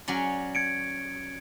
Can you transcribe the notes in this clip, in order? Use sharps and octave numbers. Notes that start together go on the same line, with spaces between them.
F#3 C#4 D5
G#6 C#7 D7